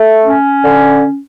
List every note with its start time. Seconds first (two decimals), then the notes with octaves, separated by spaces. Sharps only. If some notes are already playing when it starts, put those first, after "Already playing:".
Already playing: A3
0.24 C#4
0.64 D3